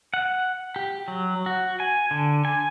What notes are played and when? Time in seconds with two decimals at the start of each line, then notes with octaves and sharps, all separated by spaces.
0.14 F#5
0.76 G4
1.08 F#3
1.46 F#4
1.80 G#5
2.11 D3
2.45 G#5